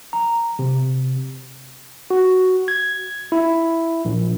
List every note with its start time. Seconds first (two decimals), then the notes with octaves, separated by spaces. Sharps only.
0.13 A#5
0.59 C3
2.11 F#4
2.68 G#6
3.32 E4
4.05 A#1